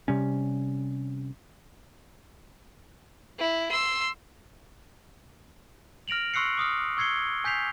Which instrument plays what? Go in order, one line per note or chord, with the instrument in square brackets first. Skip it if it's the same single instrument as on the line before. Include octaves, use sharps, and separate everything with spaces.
[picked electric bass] C3 G3 C#4
[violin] E4
C6 E6
[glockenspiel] F6 A#6 D7 F7 F#7
C6 C#6 E6 F#6 C7 C#7
D6 D#6 F6
C#6 E6 G#6 C7 C#7 G7
G#5 G6 B6 C7 F7